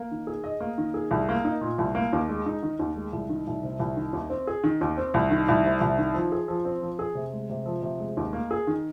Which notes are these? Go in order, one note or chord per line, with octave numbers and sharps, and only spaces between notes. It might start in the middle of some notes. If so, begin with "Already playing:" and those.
Already playing: A#3
D#3
G#4
D#5
A#3
D#3
G#4
C2
A#3
D#4
A#2
C2
A#3
D#2
G#3
D#4
D#3
D#2
G#3
C2
D#3
C2
C3
C2
D#3
D#2
C4
G#4
D#3
D#2
C4
C2
D#3
C2
C3
C2
D#3
F3
G#4
F3
C4
F3
G#4
C3
G#3
C3
F3
C3
G#3
D#2
A#3
G#4
D#3